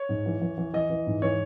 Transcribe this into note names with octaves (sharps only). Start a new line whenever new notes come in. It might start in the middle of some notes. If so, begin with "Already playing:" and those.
Already playing: C#5
G#2
E3
E3
E3
E3 D#5
E3
G#2
E3 C#5